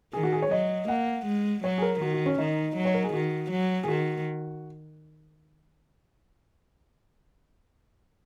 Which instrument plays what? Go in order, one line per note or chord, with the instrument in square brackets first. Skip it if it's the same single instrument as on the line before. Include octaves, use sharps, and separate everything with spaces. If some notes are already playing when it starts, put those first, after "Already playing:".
[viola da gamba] D#3 [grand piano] G#4
[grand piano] F#4
G#4
C#5
[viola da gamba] F#3 [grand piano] D#5
[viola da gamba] A#3 [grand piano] F#5
[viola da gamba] G#3
[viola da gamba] F#3 [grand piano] C#5
[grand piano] G#4
A#4
[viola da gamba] D#3 [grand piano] F#4
[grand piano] F#4
C#4
[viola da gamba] D#3 [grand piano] D#4
[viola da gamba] F#3
[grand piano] C#5
A#4
G#4
[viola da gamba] D#3 [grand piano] F#4
[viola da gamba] F#3
[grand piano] G#4
[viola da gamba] D#3 [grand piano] F#4